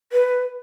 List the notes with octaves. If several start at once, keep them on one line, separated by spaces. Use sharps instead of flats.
B4